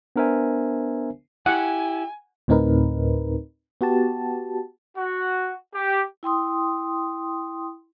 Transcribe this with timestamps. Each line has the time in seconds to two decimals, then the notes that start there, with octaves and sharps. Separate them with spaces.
0.16 B3 D4 A#4 C5 E5 G#5
1.46 E4 G4 F#5 G#5
2.48 D2 A2 C4 D#4 A#4 B4
3.81 B3 F#4 G4 A5
4.98 F#4
5.75 G4
6.23 E4 G5 C6 D#6